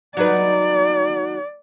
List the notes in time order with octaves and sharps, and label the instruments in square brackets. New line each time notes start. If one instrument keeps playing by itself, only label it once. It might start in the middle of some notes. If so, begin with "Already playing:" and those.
[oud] F#3 D#4 B4 [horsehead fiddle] D5